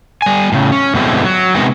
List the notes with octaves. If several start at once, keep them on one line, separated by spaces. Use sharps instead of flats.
G3 G#5
A2 C#3
C#4
G2 B2 D3 G#3 C4 E4
F#3
C3 G#3 B3 D#4 F#4 A#4